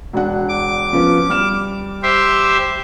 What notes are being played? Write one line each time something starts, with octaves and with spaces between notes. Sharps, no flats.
E1 D4 F#5
D6
F3 B3 C#4
G3 F6 E7
G4 C5 E5